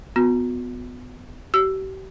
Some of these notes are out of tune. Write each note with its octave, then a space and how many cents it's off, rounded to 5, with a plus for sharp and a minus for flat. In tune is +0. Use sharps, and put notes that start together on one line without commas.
B3 +15 F#4 -40
G4 -40 E6 +10